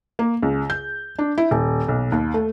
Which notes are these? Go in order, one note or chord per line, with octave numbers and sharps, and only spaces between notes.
A#3
C#2
G6
D4
E4
D#1
B1
D#2
A3